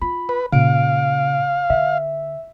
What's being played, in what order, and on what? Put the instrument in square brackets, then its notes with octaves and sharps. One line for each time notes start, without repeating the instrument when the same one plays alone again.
[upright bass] F4 [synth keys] B5
[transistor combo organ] B4
[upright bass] A#2 [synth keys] C#3 D7 [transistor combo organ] F5
[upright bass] D3 [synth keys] E5